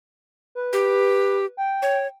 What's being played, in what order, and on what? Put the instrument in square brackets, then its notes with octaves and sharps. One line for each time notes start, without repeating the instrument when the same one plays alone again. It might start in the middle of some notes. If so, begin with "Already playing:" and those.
[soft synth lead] B4
[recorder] G4
[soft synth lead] G5
[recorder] C#5